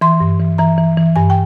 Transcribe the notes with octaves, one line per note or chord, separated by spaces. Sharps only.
E3 C6
G2
E3
E3 A#5
E3
E3
G2 G#5
G5